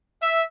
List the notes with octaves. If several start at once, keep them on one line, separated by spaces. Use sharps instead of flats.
E5